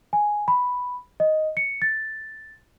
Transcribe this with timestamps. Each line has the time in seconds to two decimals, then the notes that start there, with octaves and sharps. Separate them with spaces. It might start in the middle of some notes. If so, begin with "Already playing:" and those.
0.13 G#5
0.48 B5
1.20 D#5
1.57 C#7
1.82 A6